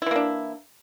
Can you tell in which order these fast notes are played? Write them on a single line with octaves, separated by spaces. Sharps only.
E4 E3 A#3 D4